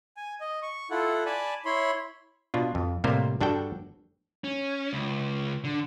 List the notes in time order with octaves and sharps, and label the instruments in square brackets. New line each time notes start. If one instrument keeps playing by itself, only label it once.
[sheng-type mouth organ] G#5
D#5
C#6
E4 F4 A4 F#5
D5 G#5 A5 B5
E4 C#5 B5 C6
[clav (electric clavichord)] B2 D4 F4
F2
A2 C3 G3 A#3 C5
G2 D4 F#4 A4 G5
[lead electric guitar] C#4
C#2
D3